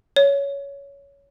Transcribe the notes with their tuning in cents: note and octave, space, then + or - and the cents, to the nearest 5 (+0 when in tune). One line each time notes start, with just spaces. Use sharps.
C#5 +15